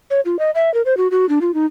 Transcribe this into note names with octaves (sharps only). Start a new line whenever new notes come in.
C#5
F4
D#5
E5
A#4
C5
F#4
F#4
D4
F4
D#4